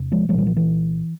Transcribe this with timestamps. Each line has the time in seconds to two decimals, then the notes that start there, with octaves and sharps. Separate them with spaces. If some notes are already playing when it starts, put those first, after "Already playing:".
Already playing: E2 C3
0.12 F3 G#3
0.29 C2 F3 G#3
0.34 A#2 E3 G3
0.47 F3
0.56 E3